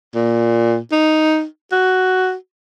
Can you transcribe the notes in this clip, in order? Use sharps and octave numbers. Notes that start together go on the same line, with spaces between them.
A#2
D#4
F#4